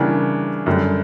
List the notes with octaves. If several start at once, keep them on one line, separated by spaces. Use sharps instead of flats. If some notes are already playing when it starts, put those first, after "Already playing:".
Already playing: C#3 E3 G3 A#3 D4
F#2 D3 G3